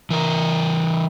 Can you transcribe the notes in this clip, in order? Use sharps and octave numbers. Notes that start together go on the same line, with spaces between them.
E3 A#4